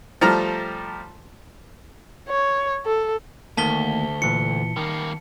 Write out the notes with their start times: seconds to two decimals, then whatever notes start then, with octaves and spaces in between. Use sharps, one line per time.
0.21 F3 G3 A3 A#5 F6
2.29 C#5
2.86 A4
3.57 D2 D#3 A3 A#3 A5 B6 G7
4.22 A#2 E3 E4 C#7
4.76 D#3 G3 A#3